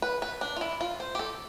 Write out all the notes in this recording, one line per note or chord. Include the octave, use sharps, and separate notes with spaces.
B4
B4
D4
F4
E4
F4
C5
G4
A4